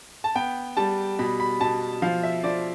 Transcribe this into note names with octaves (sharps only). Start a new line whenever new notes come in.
A5
B3 G5
G3 A5
B2 B5
B5
B2 A5
F3 F5
E5
F3 D5